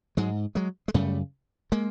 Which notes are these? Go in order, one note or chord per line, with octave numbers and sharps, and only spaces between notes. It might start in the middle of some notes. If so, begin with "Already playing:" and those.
G#2 F#3 G#3
F#3 G#3
G#3
F#2 C#3 G3 A3
G#3 A#3